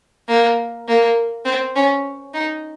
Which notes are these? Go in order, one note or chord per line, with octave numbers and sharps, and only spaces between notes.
A#3
A#3
C4
C#4
D#4